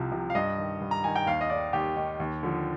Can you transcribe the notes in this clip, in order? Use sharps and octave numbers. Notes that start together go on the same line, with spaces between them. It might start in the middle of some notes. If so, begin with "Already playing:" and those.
Already playing: C2 C3 F3
C3 F3
F5
G2 D#5
D#3
G2
A#5
D#3 G#5
G5
D#2 F5
D#5
D#3 D5
D#2 G4
D#3
D#2
D3 F3